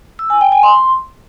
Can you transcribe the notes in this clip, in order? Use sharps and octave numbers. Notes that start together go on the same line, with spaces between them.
E6
G#5
G5
G#5
C6